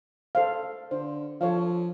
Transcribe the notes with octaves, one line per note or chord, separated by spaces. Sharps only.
A4 C5 F5
D3 C5
F3 A4 C#5 F5